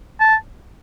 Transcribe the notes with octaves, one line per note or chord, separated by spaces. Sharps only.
A5